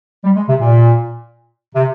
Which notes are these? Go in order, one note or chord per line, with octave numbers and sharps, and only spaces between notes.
G3
G#3
C3
A#2
C3